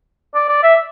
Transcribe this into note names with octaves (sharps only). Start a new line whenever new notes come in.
D5
D5
E5